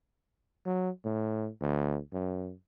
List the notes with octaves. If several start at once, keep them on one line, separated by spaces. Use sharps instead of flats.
F#3
A2
D2
F#2